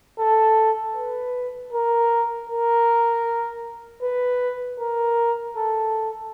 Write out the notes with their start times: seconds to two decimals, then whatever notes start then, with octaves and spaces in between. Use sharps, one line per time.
0.19 A4
0.95 B4
1.72 A#4
2.50 A#4
4.03 B4
4.80 A#4
5.57 A4